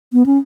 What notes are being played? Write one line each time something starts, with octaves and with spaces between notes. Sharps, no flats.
B3
C#4